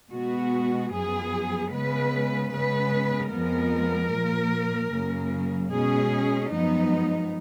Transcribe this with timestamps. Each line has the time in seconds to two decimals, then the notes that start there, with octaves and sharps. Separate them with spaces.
0.12 B2 G#3 B3 F#4
0.91 F#2 F3 B3 G#4
1.72 C#3 G#3 B3 B4
2.51 C#3 G#3 B3 B4
3.31 F2 F3 G#3 B3 A#4
4.12 A#2 F3 A#3
4.92 F#2 C#3 F#3 A#3
5.71 B2 G#3 C#4 G#4
6.51 F#2 F3 G#3 B3 D#4